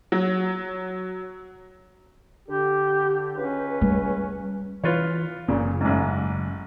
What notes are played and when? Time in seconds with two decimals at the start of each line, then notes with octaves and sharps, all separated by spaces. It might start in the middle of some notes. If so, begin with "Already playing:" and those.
0.12 F#3
2.48 D3 G4
3.35 C#2 C#4 B4
3.81 G3
4.84 E3 F4 B4 C#5
5.48 F#1 A#2 C#3
5.81 A1 G#2